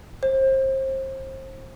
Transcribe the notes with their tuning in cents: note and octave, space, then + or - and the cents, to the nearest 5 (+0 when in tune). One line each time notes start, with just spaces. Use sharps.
C5 +30